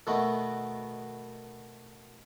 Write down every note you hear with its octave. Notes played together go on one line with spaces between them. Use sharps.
B2 D#3 A3 B3 F#4